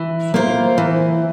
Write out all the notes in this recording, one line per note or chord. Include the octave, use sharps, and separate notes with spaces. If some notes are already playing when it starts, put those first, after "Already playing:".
Already playing: E3
A#3 F4 C5
E3